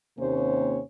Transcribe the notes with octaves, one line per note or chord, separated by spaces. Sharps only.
D#2 C3 A#3 C#4 C5 C#5